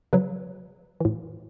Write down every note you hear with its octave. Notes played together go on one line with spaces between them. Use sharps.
C#3 F#3 B4
A2 E3